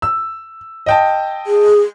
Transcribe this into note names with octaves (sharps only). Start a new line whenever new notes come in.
E6
D#5 G5 A5
G#4